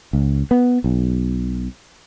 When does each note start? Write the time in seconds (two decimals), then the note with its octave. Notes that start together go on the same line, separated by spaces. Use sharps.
0.13 C#2
0.51 B3
0.84 B1